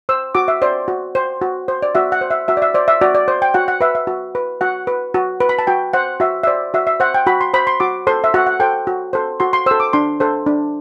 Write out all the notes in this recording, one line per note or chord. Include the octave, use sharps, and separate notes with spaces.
C5 E6
F#4 D6
E5
C5 D5
F#4
C5
F#4
C5
D5
F#4 E5
F#5
C5
E5
F#4 E5
D5
E5
C5 D5
E5
F#4 D5
D5
C5
G5
F#4 F#5
F#5
B4 E5
E5
F#4
B4
F#4 F#5
B4
F#4
B4
B5
A5
F#4 G5
C5 F#5
F#4 E5
E5
C5 D5
F#4 E5
E5
C5 F#5
G5
F#4 B5
C6
C5 B5
C6
F#4 D6
A4 C5 C6
E5
F#4 F#5
F#5
A4 C5 G5
F#4
A4 C5
F#4 C6
C6
A4 C5 E6
D6
D4 C6
A4 C5
D4